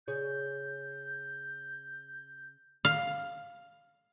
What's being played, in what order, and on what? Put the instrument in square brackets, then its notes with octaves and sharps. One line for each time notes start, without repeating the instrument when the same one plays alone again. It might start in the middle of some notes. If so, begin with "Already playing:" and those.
[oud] C#3 G#4 C#5 [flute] G6
[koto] F5